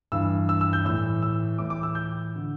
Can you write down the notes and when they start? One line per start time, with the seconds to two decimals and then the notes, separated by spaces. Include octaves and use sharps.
0.12 G2 E3 E6
0.49 E6
0.61 E6
0.73 G6
0.85 A2 E3 E6
1.22 E6
1.58 A2 E3 D6
1.70 D6
1.83 E6
1.95 G6
2.36 D3